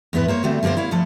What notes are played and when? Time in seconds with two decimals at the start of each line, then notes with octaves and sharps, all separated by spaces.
0.13 E2 G#2 B3 E4 B4
0.28 A#3 C5 C#5
0.44 D3 G3 A3 C4 F#4
0.63 D3 G3 A#3 B3 C5
0.77 E4 C#5 F5
0.91 D2 F3 A3 A4